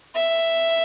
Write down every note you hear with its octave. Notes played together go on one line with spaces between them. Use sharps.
E5